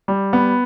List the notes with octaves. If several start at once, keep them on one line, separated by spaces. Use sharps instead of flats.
G3
B3